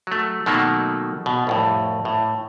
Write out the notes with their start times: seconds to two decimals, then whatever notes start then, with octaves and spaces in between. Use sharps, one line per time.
0.07 F#3 A3
0.46 B2 D#3 F#3 A3 A#3
1.26 B2
1.47 C2 F2 A2
2.05 A2